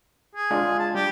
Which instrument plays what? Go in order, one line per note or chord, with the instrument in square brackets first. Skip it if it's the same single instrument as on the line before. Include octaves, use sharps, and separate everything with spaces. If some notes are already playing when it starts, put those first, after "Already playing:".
[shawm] G#4
[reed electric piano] G#3 D4 F4
[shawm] A5
[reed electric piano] G3 [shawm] G4